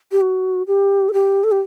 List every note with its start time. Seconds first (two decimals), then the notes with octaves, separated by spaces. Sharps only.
0.12 G4
0.21 F#4
0.67 G4
1.09 A4
1.13 G4
1.44 A4
1.52 G4